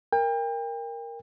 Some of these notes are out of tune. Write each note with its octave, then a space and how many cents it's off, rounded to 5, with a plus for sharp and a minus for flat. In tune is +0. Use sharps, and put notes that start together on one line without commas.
A#4 +0 G5 +35